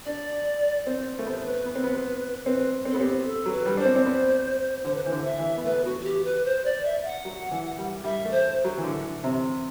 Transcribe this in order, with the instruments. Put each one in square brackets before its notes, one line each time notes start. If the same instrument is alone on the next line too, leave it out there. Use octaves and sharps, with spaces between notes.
[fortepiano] D4 [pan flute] D5
[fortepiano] C4 [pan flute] C5
[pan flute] C5
[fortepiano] A3
[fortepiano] B3 [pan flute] C5
[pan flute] C5
B4
[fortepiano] B3
C4
B3
[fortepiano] C4 [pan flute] B4
[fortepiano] C4
[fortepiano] B3 [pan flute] A4
[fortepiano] C4 [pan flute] G4
[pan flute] A4
[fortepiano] F#3
[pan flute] B4
[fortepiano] G3
[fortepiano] D4 [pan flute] C5
[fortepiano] C4
C4
B3
[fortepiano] D3 [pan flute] C5
[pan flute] B4
[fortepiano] E3 [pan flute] C5
[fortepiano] D3
[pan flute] E5
[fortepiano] E3
B3
[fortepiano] A3 [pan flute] B4
[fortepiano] B3 [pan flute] F#4
[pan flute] F#4
G4
B4
C5
D5
E5
E5
F#5
[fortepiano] F#3
E3
G3
[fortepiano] G3 [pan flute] E5
[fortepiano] A3
[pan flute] C5
[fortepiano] F#3
E3
D3
C3